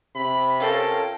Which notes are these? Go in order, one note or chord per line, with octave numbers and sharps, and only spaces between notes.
C3 B5
C#4 F4 A4 A#4 G5 A5